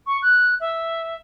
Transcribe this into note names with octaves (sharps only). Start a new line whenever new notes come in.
C#6
F#6
E5